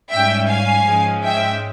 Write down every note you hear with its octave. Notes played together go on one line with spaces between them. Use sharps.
G#2 G3 C#4 E5 G5
F5 G#5
G#2 F3 G#3 C#4
E5 G5